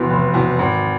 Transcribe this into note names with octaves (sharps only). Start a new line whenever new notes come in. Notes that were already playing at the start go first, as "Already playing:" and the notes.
Already playing: F1 E2 B2
F1
E2 B2
G#1